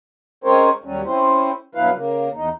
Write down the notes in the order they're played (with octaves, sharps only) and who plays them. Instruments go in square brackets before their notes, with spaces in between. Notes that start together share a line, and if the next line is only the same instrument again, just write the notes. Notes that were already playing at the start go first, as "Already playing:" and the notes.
[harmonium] G#3 C4 C#4 A#4 C5 C#5
D#2 F#3 G3 C#4
C4 C#4 E4 C5
G2 B2 F#3 E4 B4 F5
C#3 A#3
E2 D#4